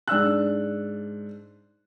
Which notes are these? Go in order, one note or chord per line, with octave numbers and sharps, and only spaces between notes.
G#2 D4 E6 F#6